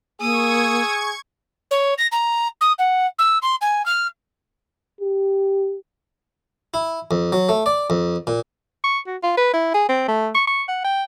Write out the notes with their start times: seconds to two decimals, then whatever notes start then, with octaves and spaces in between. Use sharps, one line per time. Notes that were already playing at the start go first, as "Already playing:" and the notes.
0.21 A#3 G#4 C#6 D#6 E6 G#6
1.71 C#5
1.98 A#6
2.12 A#5
2.61 D#6
2.79 F#5
3.18 E6
3.42 C6
3.61 G#5
3.86 F6
5.01 G4
6.74 E4
7.11 F2
7.32 F#3
7.49 A3
7.66 D5
7.90 F2
8.27 A#2
8.84 C#6
9.07 F#4
9.23 F4
9.37 B4
9.54 E4
9.74 G#4
9.89 C4
10.08 A3
10.35 C#6
10.47 C#6
10.68 F#5
10.85 G5